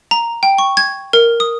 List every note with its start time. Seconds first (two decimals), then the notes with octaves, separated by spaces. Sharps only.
0.11 A#5
0.43 G5
0.58 C#6
0.77 G#6
1.13 A#4
1.40 D#6